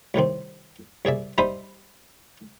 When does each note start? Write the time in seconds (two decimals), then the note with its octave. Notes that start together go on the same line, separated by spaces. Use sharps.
0.14 C2 A2 D#3 C4
1.05 C2 G#4 D5 E5
1.38 G3 D#4 C5 E5 B5 D#6